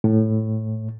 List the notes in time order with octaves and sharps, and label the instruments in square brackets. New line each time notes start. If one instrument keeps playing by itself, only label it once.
[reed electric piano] A2